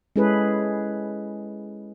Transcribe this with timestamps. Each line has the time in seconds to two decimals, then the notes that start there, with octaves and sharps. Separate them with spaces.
0.16 G#3 C#4 E4 G#4 A4 B4